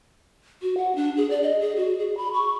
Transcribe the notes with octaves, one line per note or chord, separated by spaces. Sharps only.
F#4
F#5
D4
G#4
D5
D#5
G#4
F#4
G#4
B5
C#6